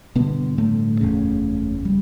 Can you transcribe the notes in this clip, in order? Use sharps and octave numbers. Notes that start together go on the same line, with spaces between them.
A1 G2 B2 D3 B3
A2 A3
F#1 E2 C#3
G3